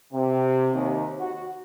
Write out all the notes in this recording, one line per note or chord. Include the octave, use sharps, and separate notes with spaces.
C3
D#2
F#4